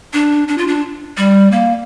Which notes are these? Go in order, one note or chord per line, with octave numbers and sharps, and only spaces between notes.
D4
D4
F4
D4
G3
A#3